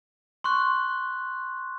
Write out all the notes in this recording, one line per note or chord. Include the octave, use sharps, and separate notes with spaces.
C6 C#6 F#6